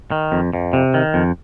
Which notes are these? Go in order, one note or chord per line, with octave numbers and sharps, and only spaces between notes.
D#3
F2
F2
C3
D#3
F2